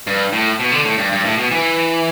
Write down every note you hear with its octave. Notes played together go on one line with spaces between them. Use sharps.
G2
A2
B2
D3
A2
G2
G2
A2
B2
E3